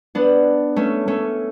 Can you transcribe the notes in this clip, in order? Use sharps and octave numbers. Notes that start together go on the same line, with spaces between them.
B3 D4
A3 C#4
A3 C#4